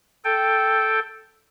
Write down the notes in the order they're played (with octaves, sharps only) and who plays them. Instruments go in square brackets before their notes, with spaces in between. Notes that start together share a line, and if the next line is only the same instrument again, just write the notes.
[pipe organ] A4 G5